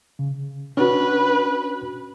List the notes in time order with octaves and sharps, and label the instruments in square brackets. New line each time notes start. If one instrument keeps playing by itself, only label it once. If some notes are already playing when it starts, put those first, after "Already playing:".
[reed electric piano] C#3
[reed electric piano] C#4 D4 F#4 [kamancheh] B4